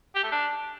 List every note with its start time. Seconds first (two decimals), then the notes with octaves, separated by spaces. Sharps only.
0.15 G4
0.23 A3
0.32 D4